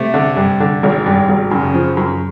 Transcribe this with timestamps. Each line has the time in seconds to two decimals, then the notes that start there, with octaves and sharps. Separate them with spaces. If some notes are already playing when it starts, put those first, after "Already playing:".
Already playing: C3 A3
0.14 D3
0.36 G2
0.60 D3
0.83 G#1
1.06 G2
1.29 G#1
1.51 F#2 C#3
1.74 F3
1.97 F#2